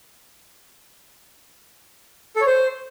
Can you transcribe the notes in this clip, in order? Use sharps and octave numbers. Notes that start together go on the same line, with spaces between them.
A4
C#5
C5